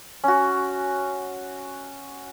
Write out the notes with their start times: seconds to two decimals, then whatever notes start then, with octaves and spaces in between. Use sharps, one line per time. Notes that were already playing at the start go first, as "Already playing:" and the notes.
0.24 C#4 F#4